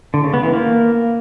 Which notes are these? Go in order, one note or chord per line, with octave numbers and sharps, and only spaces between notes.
D3
C#3
B3
E3
A#3